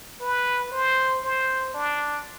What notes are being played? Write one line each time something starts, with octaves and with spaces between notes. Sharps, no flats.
B4
C5
C5
D4